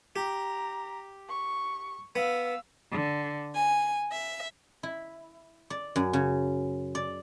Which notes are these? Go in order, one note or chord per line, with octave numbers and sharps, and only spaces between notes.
G4 A#5
C#6
B3 F5 E6
D3
G#5
E5
E4
D5
F#2
C#3
D5